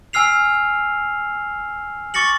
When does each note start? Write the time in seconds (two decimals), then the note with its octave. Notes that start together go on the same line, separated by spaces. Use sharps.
0.13 G#5 E6 F6 C7 F7
2.14 C#6 D6 A6 A#6 C#7 F#7